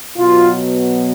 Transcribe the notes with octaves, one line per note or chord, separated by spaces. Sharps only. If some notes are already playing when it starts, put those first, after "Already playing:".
B2 F#3 B3 F4